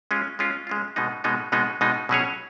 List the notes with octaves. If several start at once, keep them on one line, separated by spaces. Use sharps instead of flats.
G#3 C#4 F4
G#3 C#4 F4
G#3 C#4 F4
B2 G#3 B3 D#4
B2 G#3 B3 D#4
B2 G#3 B3 D#4
B2 G#3 B3 D#4
B2 F#3 C#4 G#4 C#5